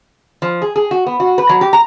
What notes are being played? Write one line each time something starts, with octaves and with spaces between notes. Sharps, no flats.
F3
G#4
G#4
F#4
B3
F#4
B4
F#3
G4
A#5